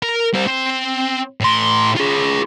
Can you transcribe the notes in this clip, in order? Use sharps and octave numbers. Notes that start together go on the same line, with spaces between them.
A#4
G3 C5
C4
A2 C6
F4 G#4